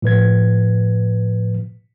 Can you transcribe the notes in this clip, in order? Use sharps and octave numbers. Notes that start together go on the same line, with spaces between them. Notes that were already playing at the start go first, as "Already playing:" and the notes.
A2 F3 B4 G#6